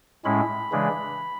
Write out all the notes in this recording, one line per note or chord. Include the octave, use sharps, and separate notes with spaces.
A2 G#3 C#4 E4 B5
C#3 E3 G#3 D4